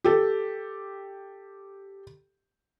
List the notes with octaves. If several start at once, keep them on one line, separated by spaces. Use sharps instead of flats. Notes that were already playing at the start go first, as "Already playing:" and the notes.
G4 A4